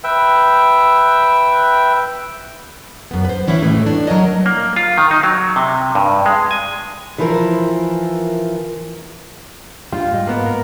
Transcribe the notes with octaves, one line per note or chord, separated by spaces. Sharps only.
B4 E5 G5
F#2 B3
B4 C5
E3 C#4 D4 E4
A2 E3 G#3 A3
D4
F#3 A#4 C#5 D#5
A#3
F4
D#3
D#4
F#3
C3
G2
G#3
G#5
E3 F3 E4 A#4
G3 D4 F4 G4
G#2 D#5
A#3 B3
A#4